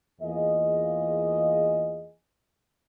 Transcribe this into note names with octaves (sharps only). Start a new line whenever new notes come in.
E2 A#3 F4 G#4 D#5